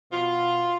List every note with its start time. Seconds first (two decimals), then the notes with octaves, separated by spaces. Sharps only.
0.12 B2 F4